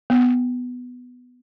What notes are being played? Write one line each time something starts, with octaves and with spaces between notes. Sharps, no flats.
B3